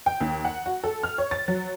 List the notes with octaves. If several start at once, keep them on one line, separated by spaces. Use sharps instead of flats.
G5
D#2
F#5
F#4
A4
F6
C#5
A6
F#3